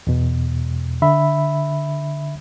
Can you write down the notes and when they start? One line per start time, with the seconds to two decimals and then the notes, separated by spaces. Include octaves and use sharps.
0.07 E2 B2
1.02 D3 E5 B5